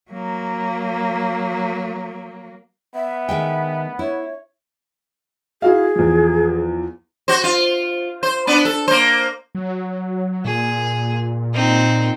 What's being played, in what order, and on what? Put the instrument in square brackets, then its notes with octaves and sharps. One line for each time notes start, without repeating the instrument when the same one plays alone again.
[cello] F#3 A#3
[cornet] B3 [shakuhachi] E5
[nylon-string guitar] D#3 G#3 G5
[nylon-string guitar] E4 [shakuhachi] C#5
[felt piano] E4 F#4 F5 [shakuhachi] G#4
[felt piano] E2 F3
[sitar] F#4 C5
F4
C5
B3 D4
A4
A#3 C5
[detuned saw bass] F#3
[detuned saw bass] A#2 [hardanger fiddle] G#4
[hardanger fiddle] C4 D#4